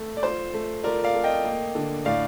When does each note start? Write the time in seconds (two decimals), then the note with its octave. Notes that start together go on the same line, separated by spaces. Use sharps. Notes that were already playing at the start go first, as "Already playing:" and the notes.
Already playing: A3
0.17 D5
0.23 F4 C5
0.54 A3
0.83 F4 A#4 D5
1.04 D5 F5
1.14 A3
1.24 D#5 G5
1.45 A#3
1.75 D3
2.05 A2 D5 F5